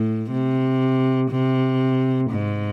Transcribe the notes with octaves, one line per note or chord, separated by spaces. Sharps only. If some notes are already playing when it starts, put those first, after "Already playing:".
Already playing: A2
C3
C3
G#2